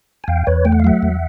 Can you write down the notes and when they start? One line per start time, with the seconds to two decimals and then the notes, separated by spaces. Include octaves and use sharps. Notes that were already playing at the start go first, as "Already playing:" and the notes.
0.24 G#5
0.28 E2 F5 G5
0.47 E2 B4 C#5
0.65 A3 G5
0.72 F#5
0.80 F5
0.84 F#3 E5 F#5
1.02 E2